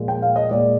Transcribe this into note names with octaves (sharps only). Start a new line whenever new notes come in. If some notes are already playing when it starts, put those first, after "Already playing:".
Already playing: A#2 F3 G#3
G5
F5
D#5
A#2 G#3 D5